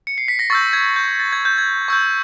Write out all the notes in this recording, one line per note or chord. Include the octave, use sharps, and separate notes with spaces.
C#7
C7
B6
A#6
C#6 E6 G6 A6
G#6
G6
A6
G#6
G6
G#6
C#6 E6 G6